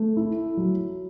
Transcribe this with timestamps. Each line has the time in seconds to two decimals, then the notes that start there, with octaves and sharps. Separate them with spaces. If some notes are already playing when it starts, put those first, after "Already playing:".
Already playing: A3
0.17 E4
0.57 F#3